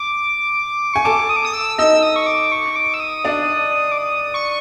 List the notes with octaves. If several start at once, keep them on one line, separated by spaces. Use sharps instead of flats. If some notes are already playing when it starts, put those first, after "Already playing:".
Already playing: D6
G#5 C#6
A4 A5 D6
D#6
D6
D#6
E6
D#4 D#5 E6
D#6
C#6
D6
C#6
D6
E6
D#6
D4 D5
D6
D#6
C#6